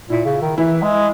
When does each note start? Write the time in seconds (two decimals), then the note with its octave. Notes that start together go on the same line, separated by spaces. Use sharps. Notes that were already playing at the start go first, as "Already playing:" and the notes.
0.09 A#2 E4
0.25 C#3
0.42 D#3
0.57 E3 E4
0.82 G#3